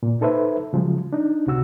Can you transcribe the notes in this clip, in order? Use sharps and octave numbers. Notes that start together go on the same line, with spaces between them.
A#2
D#4 A4 B4 C5 E5
C#3 F3 F#3 G#3
D4 D#4
C#2 C3 F#4 E6